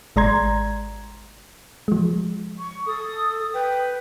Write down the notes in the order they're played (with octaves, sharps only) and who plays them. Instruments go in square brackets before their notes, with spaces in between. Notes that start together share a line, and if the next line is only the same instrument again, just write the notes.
[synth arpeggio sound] G#1 G#3 D5 A#5 C6 G#6
F3 G#3
[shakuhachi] C#6
[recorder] A4 [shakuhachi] D#6
[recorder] B4 [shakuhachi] G5